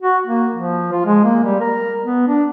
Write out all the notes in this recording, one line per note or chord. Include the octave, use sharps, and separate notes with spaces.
F#4
A#3
F3
F4
G#3
A#3
G3
A#4
B3
D4